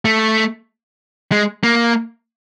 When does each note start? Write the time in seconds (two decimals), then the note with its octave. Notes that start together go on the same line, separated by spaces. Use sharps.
0.05 A3
1.32 G#3
1.64 A#3